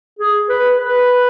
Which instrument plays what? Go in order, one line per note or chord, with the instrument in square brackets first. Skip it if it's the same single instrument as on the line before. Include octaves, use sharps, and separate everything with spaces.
[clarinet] G#4
B4
B4